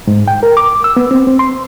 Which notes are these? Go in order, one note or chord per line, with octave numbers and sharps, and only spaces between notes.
G#2
G5
A#4
D6
E6
B3
C4
C4
C6